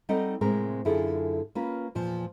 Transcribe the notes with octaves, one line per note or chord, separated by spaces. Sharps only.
G3 C4 D#4 A4 D#5 F#5
A2 C3 G#3 C4 A#4
F#2 D3 E4 F4 G#4 A4
A#3 C#4 F4 B4
E2 A#2 F3